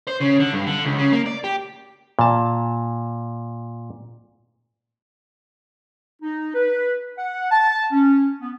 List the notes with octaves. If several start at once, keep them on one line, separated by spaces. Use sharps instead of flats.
C5
C#3
D3
G2
D3
C#2
C#3
A#3
D5
G4
A#2 A5
D#4
B4
F#5
A5
C#4
B3